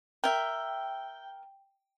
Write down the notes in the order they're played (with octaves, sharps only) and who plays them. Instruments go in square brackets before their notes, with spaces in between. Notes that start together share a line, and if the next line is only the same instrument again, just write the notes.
[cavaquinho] A#4 E5 [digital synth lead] G5